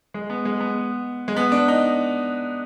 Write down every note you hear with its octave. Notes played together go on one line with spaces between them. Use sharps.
G#3
B3
G#3
B3
G#3
B3
D4
D#4